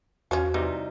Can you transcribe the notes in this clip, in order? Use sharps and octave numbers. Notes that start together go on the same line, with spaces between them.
E2 F3 C#4 F#4
C3 E3 G3 D#4